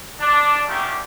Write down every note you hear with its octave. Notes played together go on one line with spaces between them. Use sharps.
D4
A#2 D3 D#3 G3 A3 G4